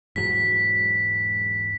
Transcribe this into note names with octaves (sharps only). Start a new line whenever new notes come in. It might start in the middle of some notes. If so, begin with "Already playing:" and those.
E1 G#2 F#3 B6